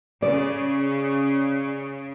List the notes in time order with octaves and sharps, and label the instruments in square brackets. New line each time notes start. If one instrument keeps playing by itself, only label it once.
[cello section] C#3 [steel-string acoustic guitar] D5